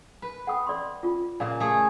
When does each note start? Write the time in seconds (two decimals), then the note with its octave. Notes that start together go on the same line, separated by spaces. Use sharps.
0.22 B4
0.47 F#5 G5 D#6
0.67 D5 C6
1.03 F4
1.40 A#2 C#3 D#4 D5 F5
1.60 A3 G#4